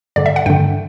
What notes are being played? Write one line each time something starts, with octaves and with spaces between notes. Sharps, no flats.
G2 D3 D5
E5
F#5
G2 D3 G5